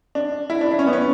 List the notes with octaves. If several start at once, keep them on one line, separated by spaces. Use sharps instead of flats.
D4
E4
D4
D4
C#4
B3
C#4